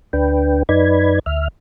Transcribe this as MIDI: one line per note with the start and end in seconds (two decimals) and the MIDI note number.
0.13 0.63 38
0.13 0.63 62
0.13 0.63 71
0.13 0.63 79
0.69 1.19 42
0.69 1.19 63
0.69 1.19 71
0.69 1.19 74
0.69 1.19 83
0.69 1.19 92
1.26 1.48 38
1.26 1.48 76
1.26 1.48 89